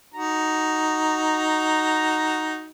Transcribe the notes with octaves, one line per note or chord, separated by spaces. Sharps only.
D#4 F#4 A#5